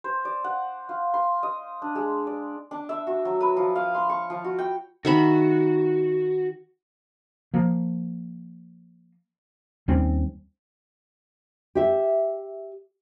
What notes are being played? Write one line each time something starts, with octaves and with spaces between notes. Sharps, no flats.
C5
D5
F#5
F4
C6
D#5
D4
G#3
D5
D4
E5
F#4
F#3
B4
F3
F5
C6
C#6
F3
F#4
G5
D#3 F#4 E5 B5
F3 A#3
D#2 G3 C4 C#4
G4 E5